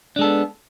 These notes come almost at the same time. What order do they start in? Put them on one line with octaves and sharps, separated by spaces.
D4 G#3 A4 B3